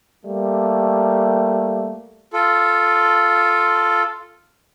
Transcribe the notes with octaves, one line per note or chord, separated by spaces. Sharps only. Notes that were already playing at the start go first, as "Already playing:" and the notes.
G3 A3 A#3
F4 A4